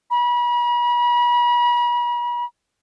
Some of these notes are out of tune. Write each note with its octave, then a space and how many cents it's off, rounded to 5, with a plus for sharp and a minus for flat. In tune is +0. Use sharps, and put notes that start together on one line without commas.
B5 -40